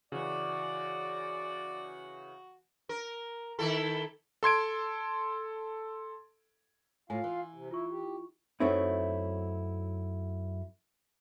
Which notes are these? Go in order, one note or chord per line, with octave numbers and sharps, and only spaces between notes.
C#3 E3 F#4 D5
A#4
D#3 E4 A4
A4 C6 G#6 D7
A2 F4 F5 G#5
E3
C3
E4 F4 C#6
G4
F#2 F#3 A3 C4 D#4 E4